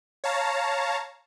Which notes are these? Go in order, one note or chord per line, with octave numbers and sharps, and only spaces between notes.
C#5 F5 A5 A#5